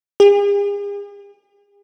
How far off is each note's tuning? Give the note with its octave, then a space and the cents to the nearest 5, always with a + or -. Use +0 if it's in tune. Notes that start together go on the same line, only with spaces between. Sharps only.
G#4 -45